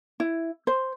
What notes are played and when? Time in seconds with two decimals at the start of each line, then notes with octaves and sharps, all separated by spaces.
0.20 E4
0.67 C5